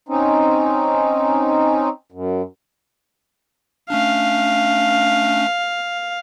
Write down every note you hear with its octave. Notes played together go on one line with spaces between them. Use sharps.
C4 C#4 D#4
F#2
A3 C#4 D4 F5